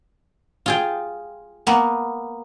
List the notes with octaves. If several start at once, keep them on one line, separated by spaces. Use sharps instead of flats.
F4 G#4 G5
A#3 B3